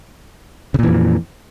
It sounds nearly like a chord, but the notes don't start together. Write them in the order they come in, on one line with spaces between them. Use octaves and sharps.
C#3 A#2 E3 F2